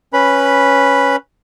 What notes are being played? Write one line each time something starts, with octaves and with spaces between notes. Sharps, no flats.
C#4 B4 B5